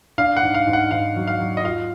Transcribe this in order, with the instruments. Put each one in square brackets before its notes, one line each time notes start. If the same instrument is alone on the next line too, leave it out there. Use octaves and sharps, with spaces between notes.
[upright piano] D4 [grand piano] F5
[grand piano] F#5
[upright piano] G#2
[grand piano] F5
[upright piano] G#2
[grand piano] F#5
[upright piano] G#2 [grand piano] F5
[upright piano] F#3
[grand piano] F5
[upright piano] F#3
[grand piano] D#5
[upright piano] F4 [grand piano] F5